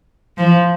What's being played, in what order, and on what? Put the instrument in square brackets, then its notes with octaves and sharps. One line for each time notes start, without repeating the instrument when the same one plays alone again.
[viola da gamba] F3